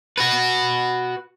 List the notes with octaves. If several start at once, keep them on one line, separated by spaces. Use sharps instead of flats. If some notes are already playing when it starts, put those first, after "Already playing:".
F#4 B4